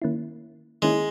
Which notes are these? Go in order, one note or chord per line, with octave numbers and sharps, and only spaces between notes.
D#3 A#3 C#4 E4
D#3 G#3 A#3 C#4 E4